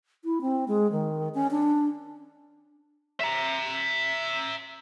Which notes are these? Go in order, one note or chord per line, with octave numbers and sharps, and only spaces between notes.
E4
C4
G#3
D#3
C#4
D4
E5 A#5